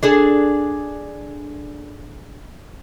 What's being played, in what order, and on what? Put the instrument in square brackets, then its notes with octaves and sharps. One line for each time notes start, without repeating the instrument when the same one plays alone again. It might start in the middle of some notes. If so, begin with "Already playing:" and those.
[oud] D4 G#4 A4